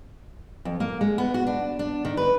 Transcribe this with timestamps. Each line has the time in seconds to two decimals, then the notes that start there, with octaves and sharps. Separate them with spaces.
0.65 F2
0.80 A#3
1.01 G#3
1.18 B3
1.34 F#4
1.47 D4
1.79 D4
2.05 D#3
2.17 B4